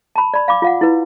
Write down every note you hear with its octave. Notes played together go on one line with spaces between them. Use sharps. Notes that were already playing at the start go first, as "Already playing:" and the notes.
A5 B5
D5 B5
F5 B5 D6
F4 F5 F#5
E4 B4